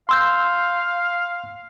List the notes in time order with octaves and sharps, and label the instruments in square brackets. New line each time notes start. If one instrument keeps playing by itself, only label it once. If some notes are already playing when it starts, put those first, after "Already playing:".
[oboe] F5 [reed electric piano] C6 E6 G6